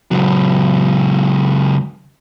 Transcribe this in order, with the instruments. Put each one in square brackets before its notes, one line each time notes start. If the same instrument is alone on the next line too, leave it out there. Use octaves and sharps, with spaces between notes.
[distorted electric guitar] C#2 F#3